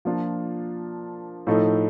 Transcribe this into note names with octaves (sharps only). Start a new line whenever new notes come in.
F3 A#3 D4 F4
A2 F3 A3 D#4